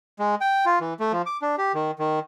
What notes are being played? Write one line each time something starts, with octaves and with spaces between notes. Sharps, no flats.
G#3
G5
F4
E3
A3
F3
D6
D4
G4
D#3
D#3